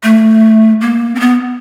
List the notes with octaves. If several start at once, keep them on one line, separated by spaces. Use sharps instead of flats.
A3
A#3
C4
B3